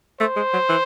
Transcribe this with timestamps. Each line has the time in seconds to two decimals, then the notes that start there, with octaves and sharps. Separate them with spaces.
0.20 A3 C5
0.36 G#3
0.53 F#3
0.69 E3